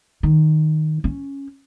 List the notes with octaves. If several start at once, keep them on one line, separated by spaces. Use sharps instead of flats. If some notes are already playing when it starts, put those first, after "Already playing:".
D#3
C#4